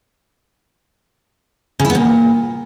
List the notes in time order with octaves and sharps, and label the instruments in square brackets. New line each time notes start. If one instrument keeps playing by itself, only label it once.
[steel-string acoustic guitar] C#3
E4
B3
A#2